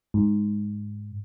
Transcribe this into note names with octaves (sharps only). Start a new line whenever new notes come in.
G#2